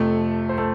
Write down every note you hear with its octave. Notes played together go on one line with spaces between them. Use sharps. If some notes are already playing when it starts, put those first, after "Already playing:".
Already playing: F2 C3 F3 A3 A4
C5
A3 A4